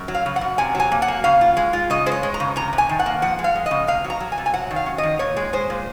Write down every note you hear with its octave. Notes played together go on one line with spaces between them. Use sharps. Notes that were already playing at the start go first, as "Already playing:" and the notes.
Already playing: F#2
F#3
F5
C#3
F#5
F#2
C3 G#5
F#3 G#5
A#3
F#5
A#3
C#3 F5
F4
G#3
F4
C#3 D#5
G#3 C5
C#5
G#3
A#5
C#3
C3 A#5
C3
G#5
D#3
F#5
A#3
F3 F#5
G#3
F5
G#3
C#3 D#5
C3 F5
F#3
A#5
F#3
G#5
C3
G#5
F#3 F#5
D#3
F5
C#4
D#3 D#5
A#2 C#5
G#3
G#3 C5
A#2